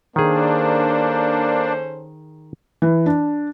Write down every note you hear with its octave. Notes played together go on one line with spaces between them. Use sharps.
D#3 A#3 C#4 D4 G#4 A4 C5
E3
D4